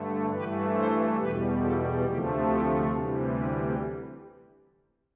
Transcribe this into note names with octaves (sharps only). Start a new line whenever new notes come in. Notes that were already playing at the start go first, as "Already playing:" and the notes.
Already playing: G2 D3 A3
G2 E3 A3 G4 B4
A4 C5
E2 B2 G3 G4 B4
F4 A4
D2 C3 F3 A3 E4 G4
E4 G4
D2 C3 E3 G3 C4
B3